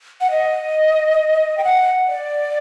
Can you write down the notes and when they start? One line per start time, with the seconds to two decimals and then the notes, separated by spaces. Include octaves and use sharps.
0.21 F#5
0.31 D#5
1.57 G5
1.64 F#5
2.08 D5